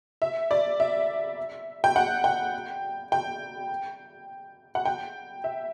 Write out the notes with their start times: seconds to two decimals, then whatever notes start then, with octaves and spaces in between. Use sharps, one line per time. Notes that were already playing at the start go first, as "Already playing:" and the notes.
0.22 E5
0.51 D5
0.80 E5
1.84 G5
1.96 F#5
2.24 G5
3.12 G5
4.75 F#5
4.85 G5
5.44 E5